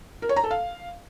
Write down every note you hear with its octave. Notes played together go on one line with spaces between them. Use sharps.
A#4
C#5
A#5
A4
F5